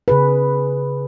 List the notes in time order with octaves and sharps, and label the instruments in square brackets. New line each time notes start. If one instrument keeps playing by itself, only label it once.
[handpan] C#3 G#4 B4